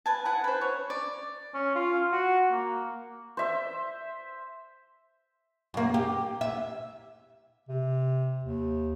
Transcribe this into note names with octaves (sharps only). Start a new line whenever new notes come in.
B4 G#5 A5
E4 F#5 G#5
B4 C5
C#5
D5
C#4
F4
F#4
A#3
C5 E5
F#2 A#3
G4
E5
C3
D#2